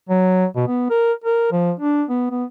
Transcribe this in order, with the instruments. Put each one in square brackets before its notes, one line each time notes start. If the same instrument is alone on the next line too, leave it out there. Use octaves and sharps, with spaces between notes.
[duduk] F#3
B2
B3
A#4
A#4
F3
D4
B3
B3